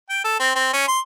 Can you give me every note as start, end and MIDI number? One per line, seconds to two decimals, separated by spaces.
0.10 0.20 79
0.24 0.35 69
0.40 0.53 60
0.55 0.71 60
0.73 0.88 61
0.88 1.00 84